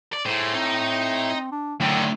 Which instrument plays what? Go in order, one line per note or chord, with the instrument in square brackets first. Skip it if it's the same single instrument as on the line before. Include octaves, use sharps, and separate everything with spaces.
[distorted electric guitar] D5
[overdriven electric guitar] A2 [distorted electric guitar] G#4 C5
[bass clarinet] C4 [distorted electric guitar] D#4
[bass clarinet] D4
[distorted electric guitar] F#2 D#3 [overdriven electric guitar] D3 [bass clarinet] F#3 [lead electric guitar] A3 G5